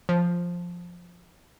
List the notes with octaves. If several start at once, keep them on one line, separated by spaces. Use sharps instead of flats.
F3